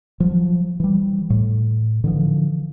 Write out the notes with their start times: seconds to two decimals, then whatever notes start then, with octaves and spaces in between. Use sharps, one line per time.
0.20 F3 F#3
0.80 E3 G3
1.30 A2
2.04 D3 E3 F3